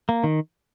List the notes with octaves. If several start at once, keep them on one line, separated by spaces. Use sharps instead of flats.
A#3
D#3